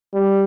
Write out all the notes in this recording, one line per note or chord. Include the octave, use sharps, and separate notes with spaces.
G3